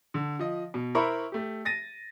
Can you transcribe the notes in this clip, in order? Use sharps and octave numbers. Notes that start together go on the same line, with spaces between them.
D3
F3 D#5
B2
E4 A#4 C5 E5 B5 C#6
A3 G4
A6 A#6 D#7